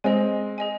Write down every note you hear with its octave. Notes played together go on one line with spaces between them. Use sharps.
G#3 C4 G#4 D#5 G#5
G#4 D#5 G#5